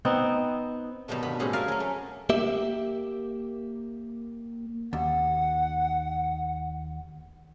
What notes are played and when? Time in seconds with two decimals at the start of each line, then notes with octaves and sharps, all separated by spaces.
0.05 B3 C4 D#4
1.08 B2 D#3 F#3 G3 A3
1.23 G2 B3 B5
1.39 A2 C4 C#4 G4 G#4 C#5
1.53 A#4 D5 E5 F5 G#5
1.68 F#3 C#4
1.80 A3
2.30 A#3 G4 E5
4.93 D#2 F#5